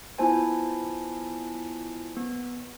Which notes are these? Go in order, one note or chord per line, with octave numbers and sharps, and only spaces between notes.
B3 E4 F4 C5 G#5 A5
B3